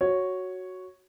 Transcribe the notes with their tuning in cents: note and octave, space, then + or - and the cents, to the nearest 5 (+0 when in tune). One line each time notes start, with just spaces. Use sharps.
F#4 +0 C#5 +0